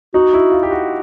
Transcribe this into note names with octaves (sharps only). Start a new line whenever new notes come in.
D#4 F#4
E4
F4
G4
F#4